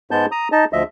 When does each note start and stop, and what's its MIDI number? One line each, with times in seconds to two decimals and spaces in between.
0.11 0.26 44
0.11 0.26 56
0.11 0.26 59
0.11 0.26 81
0.11 0.26 91
0.32 0.48 82
0.32 0.48 87
0.52 0.65 63
0.52 0.65 75
0.52 0.65 81
0.73 0.83 38
0.73 0.83 53
0.73 0.83 75
0.73 0.83 76